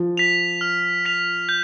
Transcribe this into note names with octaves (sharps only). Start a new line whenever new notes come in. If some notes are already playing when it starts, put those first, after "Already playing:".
Already playing: F3
B6 F7
F6
B6 F7
G6